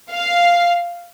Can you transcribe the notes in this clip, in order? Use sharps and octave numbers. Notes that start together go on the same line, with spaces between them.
F5